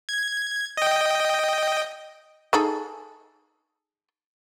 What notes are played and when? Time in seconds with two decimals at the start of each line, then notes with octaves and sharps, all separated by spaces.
0.09 G#6
0.77 D#5 G5
2.53 D#4 G#4 A4